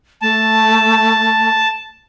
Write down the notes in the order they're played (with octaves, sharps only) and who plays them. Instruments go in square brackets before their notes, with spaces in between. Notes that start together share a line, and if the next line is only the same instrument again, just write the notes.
[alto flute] A3 [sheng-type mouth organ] A5